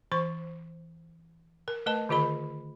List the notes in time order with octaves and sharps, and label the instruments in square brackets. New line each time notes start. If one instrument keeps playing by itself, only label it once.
[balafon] E3 C5 C#6
A#4
A3 A#4 B4 D#5 A5
D3 D#3 F4 G#4 D#5 B5